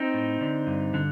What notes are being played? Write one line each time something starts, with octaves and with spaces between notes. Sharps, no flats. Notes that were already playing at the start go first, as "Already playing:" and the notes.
Already playing: C4 D#4
A2
D3
G2
D3